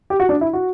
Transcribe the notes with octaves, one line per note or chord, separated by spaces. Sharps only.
G4
F#4
D4
E4
F#4